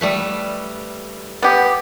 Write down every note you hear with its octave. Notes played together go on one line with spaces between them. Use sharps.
G3 A3 B4
B3 G4